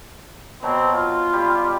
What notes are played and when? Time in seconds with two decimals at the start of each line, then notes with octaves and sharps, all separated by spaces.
0.63 B2 F#3 C4
0.93 F4
1.33 G3 G4